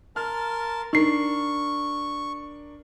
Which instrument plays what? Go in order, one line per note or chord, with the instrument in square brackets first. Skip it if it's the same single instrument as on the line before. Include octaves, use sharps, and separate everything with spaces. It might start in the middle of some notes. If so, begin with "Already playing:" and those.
[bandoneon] A#4 A5 C6 [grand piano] F6
[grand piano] D4 A#4 [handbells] D#4 C7 [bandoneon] C#6